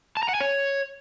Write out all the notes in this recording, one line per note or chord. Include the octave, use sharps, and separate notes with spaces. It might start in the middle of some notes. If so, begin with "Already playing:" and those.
A5
A#5
F#5
G#5
C#5